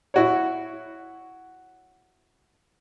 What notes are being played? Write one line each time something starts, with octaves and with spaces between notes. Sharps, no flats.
E4 F#4 C#5